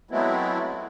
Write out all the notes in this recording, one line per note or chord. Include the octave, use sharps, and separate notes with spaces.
F#3 G#3 A3 B3 C4 E4